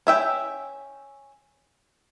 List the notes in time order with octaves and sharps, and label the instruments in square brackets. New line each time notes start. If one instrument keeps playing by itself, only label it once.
[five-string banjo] C#4 E5 G5